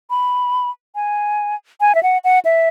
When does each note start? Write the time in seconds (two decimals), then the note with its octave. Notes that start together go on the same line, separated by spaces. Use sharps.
0.10 B5
0.95 G#5
1.81 G#5
1.95 E5
2.03 F#5
2.24 F#5
2.45 E5